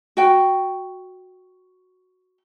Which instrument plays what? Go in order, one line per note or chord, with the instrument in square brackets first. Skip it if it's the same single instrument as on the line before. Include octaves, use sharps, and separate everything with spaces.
[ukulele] F#4 G5